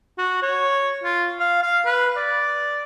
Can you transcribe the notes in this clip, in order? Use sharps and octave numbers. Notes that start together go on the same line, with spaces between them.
F#4
C#5
F4
F5
F5
B4
D5